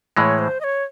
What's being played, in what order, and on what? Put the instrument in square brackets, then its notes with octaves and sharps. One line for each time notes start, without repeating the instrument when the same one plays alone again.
[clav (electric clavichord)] A2 E3 G#3 [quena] C#5 D#5
[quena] C5
D#5
C#5